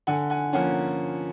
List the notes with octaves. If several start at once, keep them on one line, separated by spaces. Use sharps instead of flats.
D3 F#5 G#5
F#5 G#5
F3 A#3 C#4 F#5 G#5